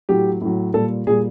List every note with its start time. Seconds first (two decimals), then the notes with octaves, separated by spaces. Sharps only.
0.09 A2 F#3 G4
0.41 A2 F#3
0.74 A#2 G3 A4
1.07 A#2 G3 G#4